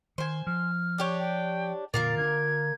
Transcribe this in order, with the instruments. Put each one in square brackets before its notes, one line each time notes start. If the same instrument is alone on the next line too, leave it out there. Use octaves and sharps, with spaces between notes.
[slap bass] D#3 [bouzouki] C5 G#5
[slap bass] F3 [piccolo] F6
[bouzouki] D4 G4 C#5
[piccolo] G5
[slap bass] A#2 D3 [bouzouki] A#3 F4 A#4 [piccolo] A6
[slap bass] D3 C4 D4 [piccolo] G#6